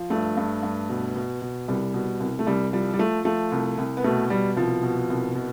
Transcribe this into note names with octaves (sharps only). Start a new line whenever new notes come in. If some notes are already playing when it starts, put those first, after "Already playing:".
Already playing: F3
G2 A3
G2
G2
B2
B2
B2
C2 G3
B2
C2
A3
C2 G3
F3 G3
G3
F3 A3
F3 A3
C2
C2
B3
B2 A3
B2 G3
C2 F3
B2
C2
B2